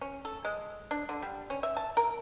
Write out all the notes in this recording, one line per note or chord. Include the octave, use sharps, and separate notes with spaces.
C#4
A4
G#3
D4
D3
G3
C#4
E5
A5
A#4